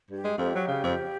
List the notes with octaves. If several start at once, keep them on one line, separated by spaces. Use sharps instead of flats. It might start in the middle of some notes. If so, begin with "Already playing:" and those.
G2
G4
G#3
F2 G4
F#3
C#3
F2